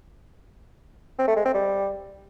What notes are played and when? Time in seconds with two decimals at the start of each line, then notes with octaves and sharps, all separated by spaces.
1.19 C4
1.27 A3
1.36 G#3
1.45 C4
1.54 G3